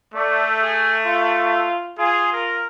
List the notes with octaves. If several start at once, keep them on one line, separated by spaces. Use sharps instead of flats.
A3 D5
G#4
F4
F4 G#4
A#4